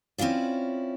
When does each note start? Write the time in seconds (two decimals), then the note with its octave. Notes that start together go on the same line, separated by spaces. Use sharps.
0.18 C4 C#4 E4 F4 D5